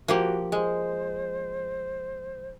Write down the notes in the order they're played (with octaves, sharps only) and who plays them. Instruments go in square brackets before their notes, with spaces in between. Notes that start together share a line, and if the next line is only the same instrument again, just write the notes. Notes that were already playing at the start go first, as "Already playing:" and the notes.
[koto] F3 A#3 G4 [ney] F#4
[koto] G#3 [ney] C5